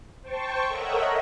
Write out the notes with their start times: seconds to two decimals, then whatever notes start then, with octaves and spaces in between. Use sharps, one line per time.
0.22 C5 G5 A5 C#6
0.67 A4 A#4 C#5 D#5 E5 F#5